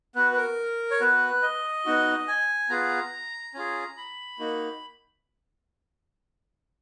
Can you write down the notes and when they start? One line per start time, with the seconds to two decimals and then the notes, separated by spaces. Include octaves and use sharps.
0.15 B3 F#4 B4
0.32 B4
0.37 A#4
0.91 C#5
1.00 B3 F#4 B4
1.42 D#5
1.85 B3 D#4 F#4
2.28 G#5
2.69 B3 F4 G#4 A#5
3.54 C#4 F4 G#4
3.97 B5
4.39 A#3 D#4 F#4